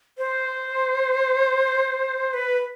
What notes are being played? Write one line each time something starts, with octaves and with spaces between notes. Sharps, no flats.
C5
B4